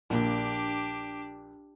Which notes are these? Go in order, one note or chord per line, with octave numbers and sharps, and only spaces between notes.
A#1 A#2 D4 G4